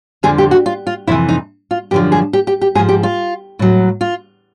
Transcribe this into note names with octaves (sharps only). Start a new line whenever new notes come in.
F2 D3 F3 G#4
G4
F#4
F4
F4
F2 C3 E3 E4
D#4
F4
F#2 D3 F3 G4
G#4
G4
G4
G4
G#2 F3 G#4
G4
F4
A2 F#3
F4